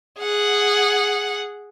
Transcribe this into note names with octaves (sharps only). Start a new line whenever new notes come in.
G#4 F#5